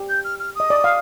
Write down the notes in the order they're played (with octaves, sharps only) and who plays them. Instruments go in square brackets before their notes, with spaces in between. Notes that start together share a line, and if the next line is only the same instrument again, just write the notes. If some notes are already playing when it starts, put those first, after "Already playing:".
Already playing: [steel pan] G4
[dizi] G6
F6
F6
[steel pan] D#5 [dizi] D#6
[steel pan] D5
F5